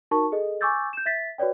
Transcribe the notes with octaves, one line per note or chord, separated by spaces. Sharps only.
D#4 F#4 A#4 A5 C#6
G#4 A4 D#5
G#5 C#6 D6 E6 G6 A6
G6 E7
E5 A6 B6
F#4 B4 C#5 D5 G5